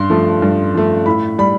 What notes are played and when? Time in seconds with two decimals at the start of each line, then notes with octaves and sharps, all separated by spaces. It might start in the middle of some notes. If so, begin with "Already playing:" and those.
Already playing: G2 C6
0.10 F3 A3
0.42 G2
0.75 F3 A3
1.06 A2 B5
1.38 G3 B5